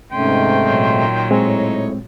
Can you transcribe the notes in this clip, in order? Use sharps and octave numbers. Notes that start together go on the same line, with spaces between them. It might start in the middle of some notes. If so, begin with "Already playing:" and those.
G#2 C3 D#3 A3 C#4 G5 C6
A#2 F#3
A2 G#3 C4 D#4 C#5